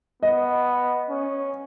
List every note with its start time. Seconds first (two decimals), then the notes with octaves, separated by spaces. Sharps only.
0.23 B3 D#5
1.09 C#4